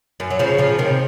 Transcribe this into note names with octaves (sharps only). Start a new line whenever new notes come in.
F#2
F#3
C#3 F3
C#3 F3
C3 D#3